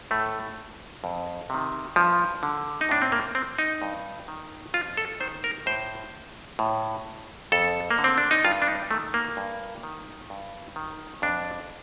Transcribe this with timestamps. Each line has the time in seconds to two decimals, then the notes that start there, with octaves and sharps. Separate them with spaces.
0.11 A2 A3
1.04 F2
1.50 C3 D#3
1.96 G2 F3
2.43 D3
2.81 D#4
2.89 A2 D4
3.02 C4
3.12 A#3
3.35 C4
3.59 D#4
3.82 G2
4.28 D#3
4.74 F2 F4
4.97 A4
5.20 D#3 C5
5.44 A#4
5.66 A2 C5
6.59 A2
7.52 F2 A4
7.91 A#3
7.98 D3
8.04 C4
8.18 D4
8.31 D#4
8.45 G2 F4
8.62 D4
8.68 D#4
8.91 D#3 A3
9.14 A#3
9.37 G2
9.83 D#3
10.30 G2
10.76 D#3
11.22 F2 D4